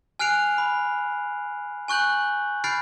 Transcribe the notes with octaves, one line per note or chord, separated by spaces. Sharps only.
G#5 F6 F#6 C7 D7 F7
B5
G#5 C#6 F#6 G6 F#7
B5 F6 G6 A6 C7 D7